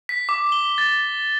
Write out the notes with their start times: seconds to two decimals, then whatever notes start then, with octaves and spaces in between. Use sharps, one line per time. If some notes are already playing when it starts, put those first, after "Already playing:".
0.09 B6
0.29 D6
0.52 G7
0.78 A6